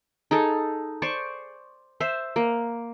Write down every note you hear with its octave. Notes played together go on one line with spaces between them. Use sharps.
D#4 G#4 A4
C5 D5 C#6
C5 E5
A#3